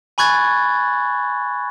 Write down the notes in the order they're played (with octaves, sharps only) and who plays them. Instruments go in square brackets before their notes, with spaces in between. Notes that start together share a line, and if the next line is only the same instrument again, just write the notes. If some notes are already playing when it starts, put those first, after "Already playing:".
[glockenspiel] G#5 B5 C#6 F#6 G#6 A6